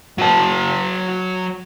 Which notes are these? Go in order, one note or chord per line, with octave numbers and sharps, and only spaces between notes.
F#3 A5